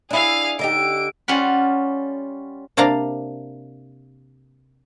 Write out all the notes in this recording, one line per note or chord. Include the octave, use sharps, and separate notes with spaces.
D4 E4 G#4 F5
D3 D#4 G4 D7
G3 C#4 F4 F#5 B5
C3 A#3 D4 D5 F5 A#5